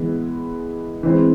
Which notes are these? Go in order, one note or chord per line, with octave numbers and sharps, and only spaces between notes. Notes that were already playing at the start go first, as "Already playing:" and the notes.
Already playing: E3 G#3 B3
E3 G#3 C4